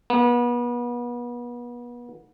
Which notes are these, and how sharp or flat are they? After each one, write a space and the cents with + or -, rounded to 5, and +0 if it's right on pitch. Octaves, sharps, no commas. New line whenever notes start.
B3 -35